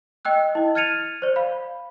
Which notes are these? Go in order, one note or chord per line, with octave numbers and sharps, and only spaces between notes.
D#5 G5 E6 F#6
E4 D#5
F6 G#6 A6 C#7 D#7 F7
C5 D5
F5 B5